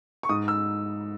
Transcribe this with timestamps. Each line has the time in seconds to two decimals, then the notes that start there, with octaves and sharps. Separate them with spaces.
0.23 C#6
0.29 G#2 D#6
0.48 E6